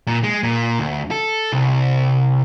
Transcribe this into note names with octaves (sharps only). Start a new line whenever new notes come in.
A#2
G#3
A#2
D2
A4
C2